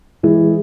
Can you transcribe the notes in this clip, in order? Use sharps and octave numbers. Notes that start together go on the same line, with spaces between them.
E3 G#3